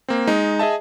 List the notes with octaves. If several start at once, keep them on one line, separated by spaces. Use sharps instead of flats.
A#3 C4
G#3 D#4
G#4 D#5 E5 A5